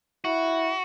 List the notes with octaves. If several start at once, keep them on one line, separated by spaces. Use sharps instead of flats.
E4 F#4